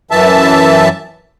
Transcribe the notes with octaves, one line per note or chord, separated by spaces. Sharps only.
F#2 E3 E5 A5